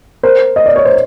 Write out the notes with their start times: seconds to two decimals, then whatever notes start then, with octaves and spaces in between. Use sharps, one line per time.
0.23 A#4 C5
0.56 D#5
0.66 D5
0.76 C#5
0.85 C5